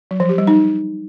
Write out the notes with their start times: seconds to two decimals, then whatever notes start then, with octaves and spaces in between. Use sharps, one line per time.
0.11 F#3
0.20 F3
0.29 G4
0.38 G3
0.47 D#4